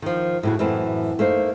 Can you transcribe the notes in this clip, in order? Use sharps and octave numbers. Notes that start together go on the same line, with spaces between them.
D#3 F3
A2 C#3 F#4
F#2 A2 E3 A3 C4
A3 A#3 D#4 C5